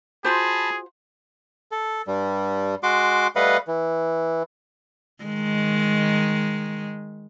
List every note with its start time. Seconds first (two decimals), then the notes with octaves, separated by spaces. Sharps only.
0.25 F4 F#4 G#4 C5 A5 B5
1.72 A4
2.07 G2 G3
2.83 G#3 F#4 C6 D6
3.36 G3 A3 B4 D#5 F5 F#5
3.67 E3
5.24 D#3 G#3